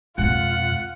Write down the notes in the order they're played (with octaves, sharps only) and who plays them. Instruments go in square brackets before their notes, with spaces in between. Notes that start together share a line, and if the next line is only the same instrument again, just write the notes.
[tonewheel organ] F2 B2 [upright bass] G#3 C4 [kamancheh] F4 [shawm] F#5